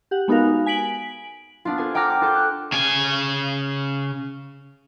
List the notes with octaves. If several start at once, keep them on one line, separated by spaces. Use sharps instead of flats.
G4 F#5
G#3 B3 D#4 F#4 A#4 F5
G#5 B6 D7 F#7
B3 D4 F4
A4 C5 G#5
F#5 G5 A#5 D6 F6 A#6
D6
F4 A4 G6
F#6
C#3 G#5